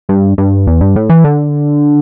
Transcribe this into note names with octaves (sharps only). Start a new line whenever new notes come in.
G2
G2
E2
G2
A2
E3
D3